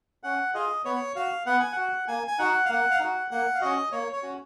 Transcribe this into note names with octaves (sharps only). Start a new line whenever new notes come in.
C#4 F#5
F4 G#4 D#5
B3 C#5
F#4 F5
B3 F#5
G#5
F#4 F#5
A#3 G#5
G#5
D#4 F#4 F#5
F5
A#3 F#5
F5
D#4 F#4 F#5
A#3 F#5
F5
C#4 F#4 D#5
A#3 C#5
C#5
C#4 F#4